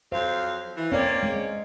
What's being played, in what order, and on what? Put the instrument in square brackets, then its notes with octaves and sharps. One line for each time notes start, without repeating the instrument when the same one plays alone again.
[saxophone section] F2 F#3 F5 [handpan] C5
[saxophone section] E3
[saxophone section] A#3 C#4 C#5 [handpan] C4 D5
[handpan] G#3